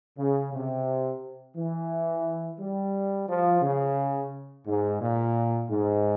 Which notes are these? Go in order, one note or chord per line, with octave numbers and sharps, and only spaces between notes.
C#3
C3
E3
G3
F3
C#3
G#2
A#2
G#2